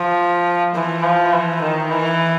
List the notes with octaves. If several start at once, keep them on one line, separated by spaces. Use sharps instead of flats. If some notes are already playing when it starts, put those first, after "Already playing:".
Already playing: F3
E3
F3
E3
D#3
E3